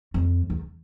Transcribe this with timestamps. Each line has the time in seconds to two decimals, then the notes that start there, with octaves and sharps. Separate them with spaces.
0.14 F2
0.50 E2